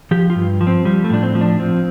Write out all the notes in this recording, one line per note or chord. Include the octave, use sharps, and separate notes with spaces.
F3 G4
F4
G2
F3
C4
F3 G3
A3
A2 D4
C4
F3
D4
F3 C4